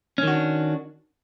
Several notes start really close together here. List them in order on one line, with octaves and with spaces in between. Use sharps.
C#4 D#3 F#4 D4